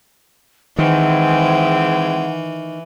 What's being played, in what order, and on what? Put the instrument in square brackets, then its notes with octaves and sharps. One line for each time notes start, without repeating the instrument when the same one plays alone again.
[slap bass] D#3 [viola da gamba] E3 [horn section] G#3 C4 E4 [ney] F#5